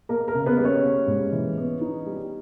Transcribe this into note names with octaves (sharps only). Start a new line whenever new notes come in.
A#3 A#4
A#4
C#3
B3 B4
G3
C#4 C#5
A#3
G#2
E3
B3
D#4
G3